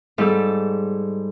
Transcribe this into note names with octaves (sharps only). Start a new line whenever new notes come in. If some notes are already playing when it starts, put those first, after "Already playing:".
G#2 G3 A4